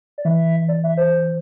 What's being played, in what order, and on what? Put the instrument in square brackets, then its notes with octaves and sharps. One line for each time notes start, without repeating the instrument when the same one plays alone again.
[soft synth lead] D5
[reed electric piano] E3 [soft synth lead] E5
[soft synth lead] D5
E5
C5